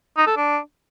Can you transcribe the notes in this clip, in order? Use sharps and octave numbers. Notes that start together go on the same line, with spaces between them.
D#4
A4
D4